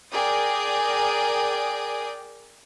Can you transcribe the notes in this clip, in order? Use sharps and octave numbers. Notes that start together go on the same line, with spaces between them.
G#4 A#4 D5 G5 D#6